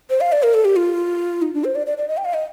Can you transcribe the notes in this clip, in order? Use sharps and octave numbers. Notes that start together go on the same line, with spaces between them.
C5
F5
D5
A#4
A4
G4
F4
D#4
D4
C5
D5
D5
D5
D#5
G5
F5
D#5